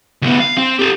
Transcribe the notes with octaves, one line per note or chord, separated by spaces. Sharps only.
D2 B3
F5
C4
G4 A4